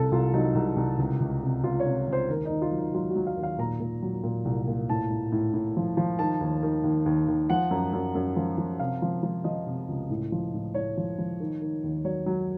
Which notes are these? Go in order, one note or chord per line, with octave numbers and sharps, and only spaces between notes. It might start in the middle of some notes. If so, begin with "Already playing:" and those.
Already playing: C2 C3 A4
C2 F4
F#3 D#4
C2
C2
C#2
C#2
C3
C#2 F4
C#5
C3
C#2 C5
D#2 A#4
D#2 D#4
F4
F#3
D#4
F#3 F4
F#4
F#3
F5
D#2
F5
A#2 A#5
A#2
F#3
A#2
C2
A#2
A2 A5
A2
A2
A2
F3
F3
D#3 A5
D#2
D#3
D#2
D#2
D#2
F3 F#5
F#2
F#2
F#2
F3
F3
C3 F5
F3
F3
F3 D#5
C3
C#2
A2
F3
A2
A2 C#5
F3
F3
D#3
D#3
D#2
F#3 C#5
F#3